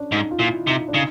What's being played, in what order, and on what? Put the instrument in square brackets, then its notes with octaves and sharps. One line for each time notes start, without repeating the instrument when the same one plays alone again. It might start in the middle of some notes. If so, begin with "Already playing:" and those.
Already playing: [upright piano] C#4 D4
[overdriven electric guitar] G#2 [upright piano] D#4
[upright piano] F4
[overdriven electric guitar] A#2 [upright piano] E4
[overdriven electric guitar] C3 [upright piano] D#4
[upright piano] D4
[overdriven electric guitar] C#3 [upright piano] D#4